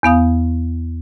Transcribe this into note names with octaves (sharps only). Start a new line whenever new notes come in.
E2 B3 F5 D#6